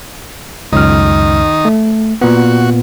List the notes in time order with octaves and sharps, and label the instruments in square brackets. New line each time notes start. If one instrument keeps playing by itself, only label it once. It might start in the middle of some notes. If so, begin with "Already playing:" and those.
[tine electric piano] C#2 F#2 F6 [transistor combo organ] D#3 D#4
[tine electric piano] A3
[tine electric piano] A#2 B3 [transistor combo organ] F#4